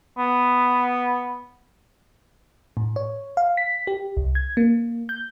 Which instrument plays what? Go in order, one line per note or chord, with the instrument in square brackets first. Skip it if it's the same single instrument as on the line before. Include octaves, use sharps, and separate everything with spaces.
[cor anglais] B3
[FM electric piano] A2
C#5
F5
B6
G4
C2
G#6
A#3
G6